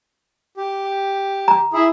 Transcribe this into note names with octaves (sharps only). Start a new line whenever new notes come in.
G4
A#5
E4 G#4